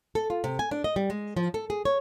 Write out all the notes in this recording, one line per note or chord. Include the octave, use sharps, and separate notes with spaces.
A4
F4
C3
G#5
D4
D#5
G3
G#3
F3
A4
G#4
C#5